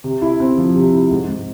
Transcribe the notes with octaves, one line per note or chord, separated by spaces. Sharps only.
C3
E4
C4
F3
C3
E4
G#2
G#2